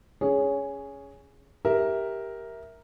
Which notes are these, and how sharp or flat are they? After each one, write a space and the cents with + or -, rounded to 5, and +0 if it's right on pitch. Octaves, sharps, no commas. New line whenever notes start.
C#4 +10 G#4 +0 C#5 +15
G4 +0 A#4 +0 E5 -10